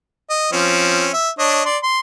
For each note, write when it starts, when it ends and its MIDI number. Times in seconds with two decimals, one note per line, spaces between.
0.30 0.48 75
0.52 1.09 53
0.52 1.09 60
0.52 1.09 61
1.13 1.29 76
1.39 1.62 62
1.39 1.62 73
1.39 1.62 75
1.65 1.77 74
1.65 1.77 84
1.83 2.00 84